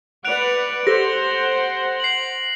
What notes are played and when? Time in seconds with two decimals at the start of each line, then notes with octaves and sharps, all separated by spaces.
0.25 B4 D5 F#5 F#6 D7 F7
0.87 G4 A4 C5 F#5 A#6
2.00 C7 F#7